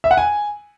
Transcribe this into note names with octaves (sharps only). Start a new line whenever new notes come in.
E5
F#5
G#5